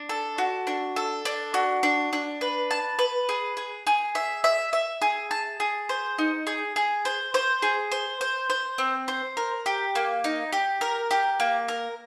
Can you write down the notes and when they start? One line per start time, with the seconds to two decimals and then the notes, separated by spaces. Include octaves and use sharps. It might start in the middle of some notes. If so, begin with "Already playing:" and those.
Already playing: D4
0.09 A4
0.38 F#4
0.67 D4
0.96 A4
1.25 D4
1.54 F#4
1.83 D4
2.13 D4
2.41 B4
2.71 A5
2.99 B4
3.29 G#4
3.57 G#4
3.87 G#4
4.15 E5
4.44 E5
4.73 E5
5.02 G#4
5.31 A5
5.60 G#4
5.89 C5
6.18 D#4
6.47 G#4
6.76 G#4
7.05 C5
7.34 C5
7.62 G#4
7.92 C5
8.21 C5
8.50 C5
8.78 C4
9.08 C5
9.37 A#4
9.66 G4
9.95 A#3
10.24 D#4
10.53 G4
10.81 A#4
11.11 G4
11.40 A#3
11.68 A#4